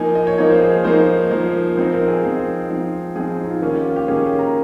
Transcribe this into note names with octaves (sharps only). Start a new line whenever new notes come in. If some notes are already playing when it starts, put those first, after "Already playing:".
Already playing: F3 A#3 D#4 G#5
D#5
C#5
F3 A#3 D#4 C#5
C5
G#4
A#4
F3 A#3 D#4 C5
F3 A#3 D#4
F3 C4 D#4 C5
A#4
G#4
F3 C4 D#4
F3 C4 D#4
F3 C4 D#4 G#4
D#4
F4
D#3 A#3 C#4 G4
F4
F4
G4
D#3 A#3 C#4 G#4
C#5
A#5